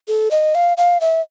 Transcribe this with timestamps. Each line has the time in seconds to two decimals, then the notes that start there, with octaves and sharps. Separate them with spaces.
0.08 A4
0.31 D#5
0.55 F5
0.77 F5
1.01 E5